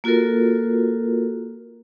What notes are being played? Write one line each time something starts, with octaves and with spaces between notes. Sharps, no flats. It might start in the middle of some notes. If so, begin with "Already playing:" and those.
A#3 F4 F#4 A4 A#4